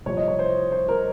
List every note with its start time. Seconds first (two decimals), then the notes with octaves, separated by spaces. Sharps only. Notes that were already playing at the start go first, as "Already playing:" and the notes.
0.06 C2 C3 F3 C#5
0.17 D#5
0.28 C#5
0.39 C5
0.72 C5
0.88 A#4